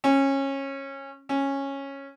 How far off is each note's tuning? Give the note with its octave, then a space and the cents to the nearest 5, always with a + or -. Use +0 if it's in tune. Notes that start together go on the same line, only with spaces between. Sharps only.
C#4 -20
C#4 -10